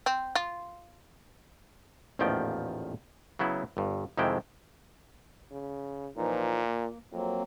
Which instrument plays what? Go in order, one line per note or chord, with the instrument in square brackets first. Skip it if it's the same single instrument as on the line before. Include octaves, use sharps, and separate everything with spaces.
[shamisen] C4
F4
[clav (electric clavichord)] A1 E2 A#2 D#3 F3 G5
C#3 F#3 B3 E4
G1 G2
F2 C3 D#3 G#3 E4 G5
[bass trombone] C#3
[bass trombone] A#2 [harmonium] E3 F3 D#4
[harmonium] A#3
[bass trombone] F2 [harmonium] F#3 A#3 C4